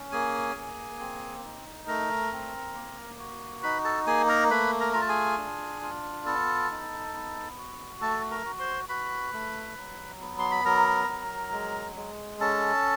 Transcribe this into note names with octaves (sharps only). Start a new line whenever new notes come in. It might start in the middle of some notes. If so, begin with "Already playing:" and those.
Already playing: C#4
A#3 G#4 G#5
A#3
C4
D#4
A3 A#4 A#5
C4
A#3
F#4
D#4 B4 B5
A4 A5
A#3 G#4 G#5
A#4 A#5
A3 B4 B5
A#4 A#5
F4 A#5
A5
G#4 G#5
D4
F4
B3 A4 A5
D#4
B3
F#4
A3 A4 A5
A#4 A#5
F#4
C5 C6
F#4 B4 B5
A3
F#3
B3
C6
B5
F#3 A#4 A#5
F#3
G#3
G#3
C#4 A4 A5